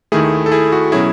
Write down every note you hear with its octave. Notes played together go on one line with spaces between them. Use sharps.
D#2 D#3 A3 E4 G#4
A4
E4 G#4
F#4
B2 F#3 C#4 E4 G#4